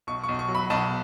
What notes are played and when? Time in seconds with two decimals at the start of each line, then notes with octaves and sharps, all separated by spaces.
0.07 B1 C#6
0.23 C#6
0.28 B1
0.39 C#6
0.49 F#3
0.55 B5
0.70 B1 A5